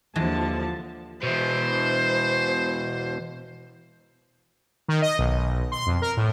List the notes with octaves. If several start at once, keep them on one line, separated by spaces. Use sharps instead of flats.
D#2 D3 E3 F3 G#3 A5
B2 E3 C5
D#3
D#5
B1
C6
F2
A#4
A2